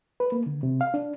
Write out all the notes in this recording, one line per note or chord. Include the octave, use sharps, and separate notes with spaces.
B4
A#3
D3
C3
F5
D4